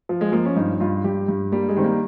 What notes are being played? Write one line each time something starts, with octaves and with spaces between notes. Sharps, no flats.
F3
G#3
F3 A#3
C#4
G2 D#4
G2 F4
G2 G4
G2
G3 A#3
G#3
D#3 C4
A#3